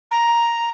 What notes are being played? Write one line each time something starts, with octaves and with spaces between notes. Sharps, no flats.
A#5